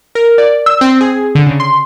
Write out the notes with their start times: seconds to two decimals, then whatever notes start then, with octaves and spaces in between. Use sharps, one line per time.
0.15 A#4
0.38 D5
0.66 E6
0.81 C4
1.01 G#4
1.35 D3
1.47 C#3
1.60 C6